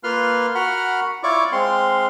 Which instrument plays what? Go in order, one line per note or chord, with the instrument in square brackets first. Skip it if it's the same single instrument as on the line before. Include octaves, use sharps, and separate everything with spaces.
[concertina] A#3 F4 B4 C6 F6
F#4 A#4 F#5 B5 F6
E4 F4 C#5 D5 C#6 D6
G#3 C4 F5 C6